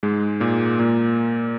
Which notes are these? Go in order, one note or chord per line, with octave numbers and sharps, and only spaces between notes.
G#2 G#3
A#2 A#3
A#2 A#3